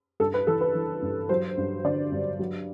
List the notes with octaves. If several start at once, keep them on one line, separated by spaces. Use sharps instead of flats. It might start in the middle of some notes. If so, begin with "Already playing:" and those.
G2 A4
B4
E3 A4
B4
E3
G2
F#3 C5
G2
D3 D5
G2
F#3